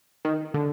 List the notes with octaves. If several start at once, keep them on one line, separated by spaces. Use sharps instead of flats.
D#3
D3